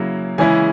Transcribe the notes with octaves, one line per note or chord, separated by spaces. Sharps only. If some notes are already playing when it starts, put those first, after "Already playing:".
Already playing: C#3 F#3 A#3 E4
C#3 E3 G#3 C#4 E4 G#5